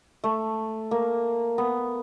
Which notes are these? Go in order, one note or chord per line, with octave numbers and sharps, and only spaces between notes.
A3
A#3
B3